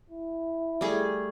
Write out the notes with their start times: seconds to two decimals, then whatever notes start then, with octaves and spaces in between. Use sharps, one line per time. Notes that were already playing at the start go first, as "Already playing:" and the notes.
0.10 E4
0.81 G3 A3 G#4